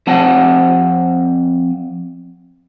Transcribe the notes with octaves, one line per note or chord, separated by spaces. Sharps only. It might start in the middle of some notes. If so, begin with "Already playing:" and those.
F2 C4 F#5 A5